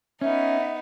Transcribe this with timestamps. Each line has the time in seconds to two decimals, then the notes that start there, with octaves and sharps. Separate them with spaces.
0.21 B3 C#4 D#4 E5